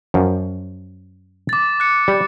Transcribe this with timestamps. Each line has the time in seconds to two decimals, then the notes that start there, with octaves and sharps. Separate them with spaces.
0.14 F#2 F3
1.49 D6 A6
1.80 F#6 C#7
2.08 G3